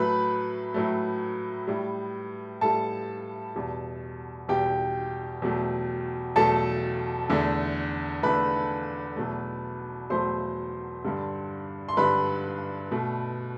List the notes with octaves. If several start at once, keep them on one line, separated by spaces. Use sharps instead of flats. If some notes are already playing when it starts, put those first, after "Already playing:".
Already playing: A2 F#3 A3 B4 B5
A2 F#3 A3
A2 G3
A2 G3 A4 A5
E2 B2 G3
E2 B2 G3 G4 G5
E2 B2 F#3 A3
E2 B2 F#3 A3 A4 A5
E2 D3 A3
E2 D3 A3 B4 B5
E2 B2 F#3 A3
E2 B2 F#3 A3 C5 C6
G2 D3 G3
C6
G2 D3 G3 B4 B5
B2 A3